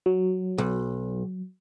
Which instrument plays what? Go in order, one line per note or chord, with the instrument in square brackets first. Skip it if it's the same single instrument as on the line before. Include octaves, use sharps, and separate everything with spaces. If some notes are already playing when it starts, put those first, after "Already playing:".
[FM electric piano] F#3
[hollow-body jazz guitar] B1